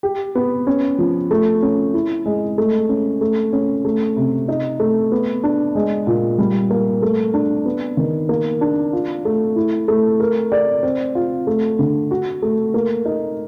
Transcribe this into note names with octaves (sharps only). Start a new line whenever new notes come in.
G4
B3
C#4
F3
A3
C#4
E4
G#3
A3
C#4
A3
C#4
A3
C3
D#4
A3
B3
D4
G#3
A#2
G3
A#3
A3
D4
B3
D#3
A#3
D4
F4
A3
E4
A3
A#4
D5
C4
F4
A3
D3
F#4
A3
A#3
D#4